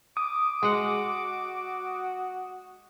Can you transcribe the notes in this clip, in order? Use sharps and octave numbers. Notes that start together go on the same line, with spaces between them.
D6 D#6
G#3 F#4 F#5